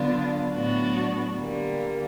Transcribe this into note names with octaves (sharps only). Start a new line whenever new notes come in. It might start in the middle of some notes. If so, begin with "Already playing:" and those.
Already playing: D3 F#3 B3 D4 F4
A2 F#3 B3 D4 F#4
D3 G3 A#3